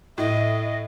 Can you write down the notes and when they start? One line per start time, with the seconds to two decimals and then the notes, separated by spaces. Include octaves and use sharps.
0.18 A2 D#5 E5